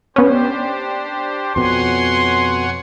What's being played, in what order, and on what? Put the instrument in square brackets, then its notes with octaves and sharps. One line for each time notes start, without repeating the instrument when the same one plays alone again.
[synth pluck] B3 C#4 [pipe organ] D4 G4 C5
[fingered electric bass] F2 B2 [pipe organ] C#5 F#5 G#5 [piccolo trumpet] C6